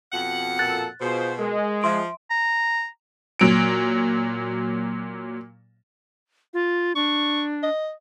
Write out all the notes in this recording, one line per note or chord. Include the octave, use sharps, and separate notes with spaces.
F2 B2 F#5
A#2 A4 F#6 A6
B2 F4 G#4 C5
G#3 A#4
F3 E5 C6 D7
A#5
A#2 F#3 D7
F4
D4 C#6
D#5